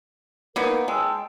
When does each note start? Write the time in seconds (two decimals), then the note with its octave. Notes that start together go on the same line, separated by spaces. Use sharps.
0.56 A#3 B3 D#4 A#4
0.88 G#3 G5 A5 E6